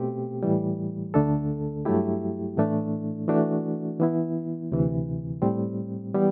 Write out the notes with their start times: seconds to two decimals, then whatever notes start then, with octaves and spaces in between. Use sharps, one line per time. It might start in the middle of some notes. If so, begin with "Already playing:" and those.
Already playing: B2 A3 C4 G4
0.43 A2 E3 G3
1.14 D2 D3 A3 D4 A4
1.85 G2 F#3 A3 E4 G4
2.57 A2 E3 A3 D4
3.28 E3 A3 D4 F#4
4.00 E3 B3 E4
4.72 D2 C3 E3
5.42 A2 G3 C4
6.14 E3 G3 B3